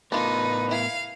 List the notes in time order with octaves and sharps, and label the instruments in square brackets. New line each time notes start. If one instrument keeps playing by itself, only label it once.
[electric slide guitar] A2 B3 A#4 [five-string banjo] D4 F4 [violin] D#4 [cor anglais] B4
[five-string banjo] E4 G#5 [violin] F5